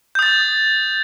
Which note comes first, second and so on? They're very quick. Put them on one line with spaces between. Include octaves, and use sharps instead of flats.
G6 D#6 A6